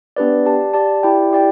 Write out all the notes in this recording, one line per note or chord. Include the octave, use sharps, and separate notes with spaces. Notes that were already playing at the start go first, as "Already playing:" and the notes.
B3 D4 G4 B4 D5
G4 D5 A5
G4 D5 A5
E4 G4 D5 G5
E4 G4 D5 G5